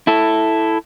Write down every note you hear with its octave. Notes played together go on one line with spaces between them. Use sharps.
E4 A4